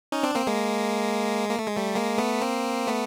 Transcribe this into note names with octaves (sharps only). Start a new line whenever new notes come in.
C#4 D#4
C4 D4
A#3 C4
G#3 A#3
A#3
A3
G#3
G3 A3
G#3 A#3
A3 B3
A#3 C4
A3 B3